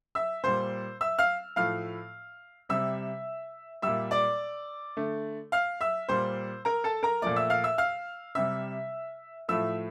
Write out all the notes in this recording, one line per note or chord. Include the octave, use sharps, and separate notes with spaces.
E5 E6
A#2 G3 C5 C6
E5 E6
F5 F6
A2 F3 A3 F5 F6
C3 G3 E5 E6
A#2 G3 E5 E6
D5 D6
D3 A3
F5 F6
E5 E6
A#2 G3 C5 C6
A#4 A#5
A4 A5
A#4 A#5
A#2 F3 A3 D5 D6
E5 E6
F5 F6
E5 E6
F5 F6
C3 G3 E5 E6
A2 F3 A3 E5 E6